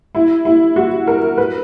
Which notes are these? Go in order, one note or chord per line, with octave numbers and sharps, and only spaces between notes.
E4
E4
F#4
A#4
B4